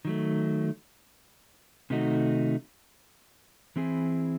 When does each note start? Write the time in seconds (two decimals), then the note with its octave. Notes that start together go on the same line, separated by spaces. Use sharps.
0.05 D#3 F#3 A3
1.90 C3 D#3 A3 D#4 F#4
3.76 E3 C4 E4 G#4